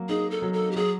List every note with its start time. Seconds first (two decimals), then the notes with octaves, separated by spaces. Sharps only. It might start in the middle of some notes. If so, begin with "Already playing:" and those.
Already playing: F#3 A#3
0.09 D#4 G#4
0.31 A4
0.42 F#3
0.53 A4
0.72 G4
0.76 F#3 G#4